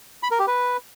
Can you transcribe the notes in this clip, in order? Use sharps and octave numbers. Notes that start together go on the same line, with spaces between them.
B5
A#4
G4
B4